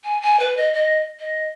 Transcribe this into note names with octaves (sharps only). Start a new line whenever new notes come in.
G#5
G#5
B4
D#5
D#5
D#5